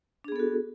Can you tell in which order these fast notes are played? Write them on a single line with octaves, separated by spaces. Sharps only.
D4 G#4 B3 A4 F#4